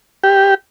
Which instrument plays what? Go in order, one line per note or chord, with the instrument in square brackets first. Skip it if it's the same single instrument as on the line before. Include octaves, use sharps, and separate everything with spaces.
[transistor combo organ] G4